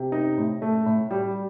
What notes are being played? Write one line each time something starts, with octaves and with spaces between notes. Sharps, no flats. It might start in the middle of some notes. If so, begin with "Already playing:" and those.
Already playing: C3
D#4
A2
A3
A2
G3